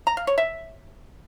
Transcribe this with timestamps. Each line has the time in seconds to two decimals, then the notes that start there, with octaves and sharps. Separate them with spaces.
0.07 A#5
0.17 F5
0.27 C#5
0.38 E5